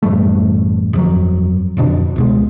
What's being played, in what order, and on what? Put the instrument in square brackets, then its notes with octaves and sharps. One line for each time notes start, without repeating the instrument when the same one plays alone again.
[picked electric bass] A1 F#2 G3 A3
G1 F2 F#3
D1 F2 B2 D4
C#2 B2 G#3